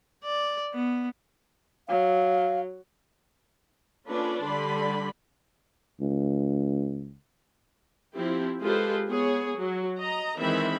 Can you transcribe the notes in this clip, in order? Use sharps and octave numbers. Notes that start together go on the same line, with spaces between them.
D5
B3
F#3 F5
A#3 C#4 D4 F4 A4 B4
D3 G3 D5 B5 C6
C#2
F3 C4 E4 G4
G#3 F4 G4 A4 B4 C5
B3 G#4 C#5
F#3
D#5 A#5
D#3 E3 G#3 C4 E5 B5